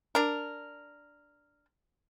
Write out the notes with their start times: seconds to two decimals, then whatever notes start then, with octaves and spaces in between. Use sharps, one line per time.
0.15 D4 A#4